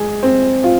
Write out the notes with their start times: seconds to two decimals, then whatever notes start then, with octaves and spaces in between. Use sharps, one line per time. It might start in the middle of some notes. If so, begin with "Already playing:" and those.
Already playing: G#3 G#4
0.23 C4
0.64 F4